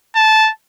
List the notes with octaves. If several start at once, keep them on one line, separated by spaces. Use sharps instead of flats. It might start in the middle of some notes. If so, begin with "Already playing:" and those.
A5